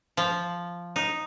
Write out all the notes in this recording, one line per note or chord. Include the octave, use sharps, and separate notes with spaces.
F3
D#4